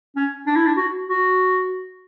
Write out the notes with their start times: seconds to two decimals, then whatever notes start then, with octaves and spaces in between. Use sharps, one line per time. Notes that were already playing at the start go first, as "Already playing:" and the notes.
0.16 C#4
0.47 D4
0.56 E4
0.67 D4
0.77 F#4
1.08 F#4